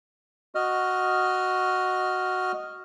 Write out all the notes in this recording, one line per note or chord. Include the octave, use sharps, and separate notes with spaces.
F#4 D#5 F6